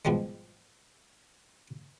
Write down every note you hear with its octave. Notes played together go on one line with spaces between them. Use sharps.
G#2 B2 F3 G3 G#3